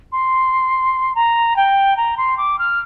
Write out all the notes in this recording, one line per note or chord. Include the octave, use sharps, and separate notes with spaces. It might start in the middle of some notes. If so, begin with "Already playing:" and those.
C6
A#5
G5
A#5
C6
D6
F6